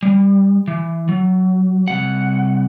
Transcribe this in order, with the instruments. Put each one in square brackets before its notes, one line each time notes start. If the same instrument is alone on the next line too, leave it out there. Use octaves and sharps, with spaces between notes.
[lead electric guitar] G3
E3
F#3
C2 F#5